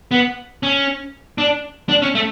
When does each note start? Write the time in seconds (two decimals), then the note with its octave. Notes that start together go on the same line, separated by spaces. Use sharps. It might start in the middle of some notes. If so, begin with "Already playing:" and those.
0.11 B3
0.63 C#4
1.38 D4
1.89 D4
2.02 C#4
2.15 A3